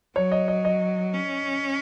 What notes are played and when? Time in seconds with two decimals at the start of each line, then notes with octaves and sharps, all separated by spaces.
0.15 F#3 C#5
0.32 D#5
0.48 D#5
0.65 D#5
1.14 C#4